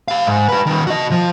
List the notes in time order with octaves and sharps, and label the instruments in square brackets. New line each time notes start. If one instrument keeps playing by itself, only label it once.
[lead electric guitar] G4 F5
G#2
G4 B4
D#3 G3
F#4 D#5
F3